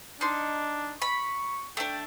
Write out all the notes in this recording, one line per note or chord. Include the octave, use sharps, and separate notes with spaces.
D4 D#4 C6
B5 C#6
A3 D4 G5